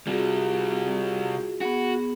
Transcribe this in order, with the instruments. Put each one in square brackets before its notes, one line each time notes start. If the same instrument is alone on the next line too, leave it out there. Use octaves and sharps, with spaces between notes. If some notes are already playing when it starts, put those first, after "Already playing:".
[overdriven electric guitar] C3 G3 [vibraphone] F4 F#4 G#4
[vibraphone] B3 G#4 [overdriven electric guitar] F#4